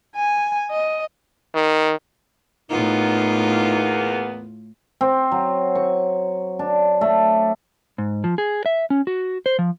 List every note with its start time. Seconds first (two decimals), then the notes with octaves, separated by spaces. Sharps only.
0.16 G#5
0.71 D#5
1.55 D#3
2.71 E2 A2 A#3 B3 D#4 F4
5.01 C4
5.32 F#3
5.75 C#6
6.59 D4
7.01 A3
7.98 G#2
8.24 F3
8.38 G#4
8.66 E5
8.90 C#4
9.07 F#4
9.46 C5
9.59 F3